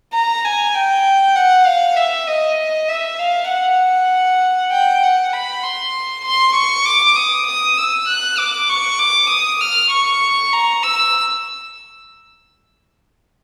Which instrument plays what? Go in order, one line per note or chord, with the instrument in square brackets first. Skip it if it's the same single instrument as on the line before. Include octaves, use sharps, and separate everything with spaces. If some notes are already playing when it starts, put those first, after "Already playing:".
[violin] A#5
G#5
G5
F#5
F5
E5
D#5
E5
F5
F#5
G5
F#5
B5
C6
C6
C#6
D6
D#6
D#6
E6
F#6
D6
C#6
D6
D#6
F6
C#6
A#5
E6